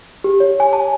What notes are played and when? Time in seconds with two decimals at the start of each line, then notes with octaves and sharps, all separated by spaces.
0.24 G4
0.40 C#5
0.60 G#5
0.73 A5